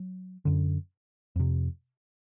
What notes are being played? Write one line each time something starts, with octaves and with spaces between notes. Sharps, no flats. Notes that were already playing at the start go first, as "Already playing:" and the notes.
Already playing: F#3
F#2 D3
F2 C3